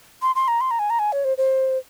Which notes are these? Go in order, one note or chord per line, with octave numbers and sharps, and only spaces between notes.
C6
C6
A#5
C6
A#5
G#5
A#5
G#5
C#5
C5
C5